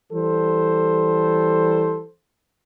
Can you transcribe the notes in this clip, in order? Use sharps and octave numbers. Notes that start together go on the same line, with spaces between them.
E3 G3 A4 C5